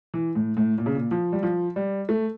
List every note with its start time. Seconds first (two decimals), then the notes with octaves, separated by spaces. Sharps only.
0.14 E3
0.35 A2
0.57 A2
0.78 A#2
0.86 C#3
0.95 A#2
1.11 F3
1.33 G3
1.43 F3
1.76 G3
2.09 A3